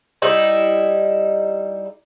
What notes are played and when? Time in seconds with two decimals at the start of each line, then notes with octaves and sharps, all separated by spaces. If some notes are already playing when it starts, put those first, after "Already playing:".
0.22 G3 D#4 E4